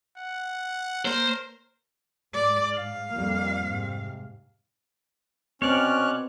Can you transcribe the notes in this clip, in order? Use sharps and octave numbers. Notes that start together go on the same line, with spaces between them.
F#5
A#3 A#4 C5
G#2 D5
F5
F2 G3 A#3
G#2 C3
B2 C4 C#4 C#5 D5 F6 F#6